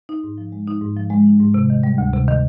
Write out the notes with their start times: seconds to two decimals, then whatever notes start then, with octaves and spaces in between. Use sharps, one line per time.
0.09 D#4
0.23 G#2
0.38 F3
0.52 G#3
0.67 D#4
0.81 G#2
0.97 F3
1.10 G#3
1.26 D#4
1.40 G#2
1.54 C3
1.70 D#3
1.83 G3
1.98 D2
2.13 C3
2.28 D#3